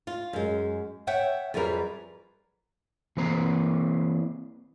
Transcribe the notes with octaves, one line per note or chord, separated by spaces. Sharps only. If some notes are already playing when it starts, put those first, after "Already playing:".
F4
F#2 G#3
C#5 E5 F#5 G5
F2 F#3 G3 G#4 A#4 B4
E3 A#3 C4 B4 C5 A#5